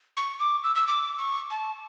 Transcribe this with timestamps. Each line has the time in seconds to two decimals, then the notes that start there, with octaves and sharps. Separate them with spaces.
0.17 C#6
0.40 D6
0.64 E6
0.75 E6
0.87 D6
1.19 C#6
1.51 A5